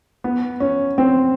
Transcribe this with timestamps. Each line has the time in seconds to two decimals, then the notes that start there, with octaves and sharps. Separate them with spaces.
0.24 B3
0.60 C#4
0.98 C4